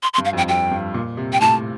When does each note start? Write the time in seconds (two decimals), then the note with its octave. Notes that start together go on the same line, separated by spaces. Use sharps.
0.03 C6
0.14 C6
0.18 G2
0.25 F5
0.33 F2
0.37 G5
0.48 F2 G5
0.71 G2
0.94 A#2
1.17 C3
1.33 G5
1.41 A2 A5